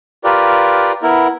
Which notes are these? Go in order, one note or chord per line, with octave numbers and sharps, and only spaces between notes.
F4 G4 A#4 B4 D5
B3 E4 A#4